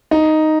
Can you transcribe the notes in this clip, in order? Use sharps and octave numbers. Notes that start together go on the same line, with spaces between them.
D#4